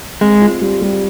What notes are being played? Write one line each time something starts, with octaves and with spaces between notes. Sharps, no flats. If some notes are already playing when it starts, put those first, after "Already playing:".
G#3 C4
F4
G3
G3